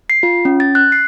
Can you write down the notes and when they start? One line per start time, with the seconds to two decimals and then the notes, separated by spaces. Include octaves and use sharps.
0.10 C7
0.23 F4
0.45 C#4
0.60 A6
0.75 F#6
0.92 C7